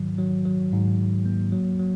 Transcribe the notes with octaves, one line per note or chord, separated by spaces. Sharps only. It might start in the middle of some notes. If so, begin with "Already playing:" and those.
Already playing: G#2 D#3 F#3
F#3
F#3
G#2
G#2
A#3
F#3
F#3